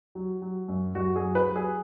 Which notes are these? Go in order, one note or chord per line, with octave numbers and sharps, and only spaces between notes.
F#3
F#3
F#2
F#2 F#4
G#4
F#3
B4
F#3
G#4